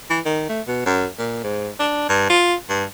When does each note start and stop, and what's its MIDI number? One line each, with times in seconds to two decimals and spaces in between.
0.10 0.20 52
0.25 0.45 51
0.49 0.61 57
0.68 0.84 47
0.86 1.07 42
1.19 1.41 46
1.44 1.69 44
1.80 2.07 62
2.09 2.28 43
2.30 2.55 65
2.70 2.84 43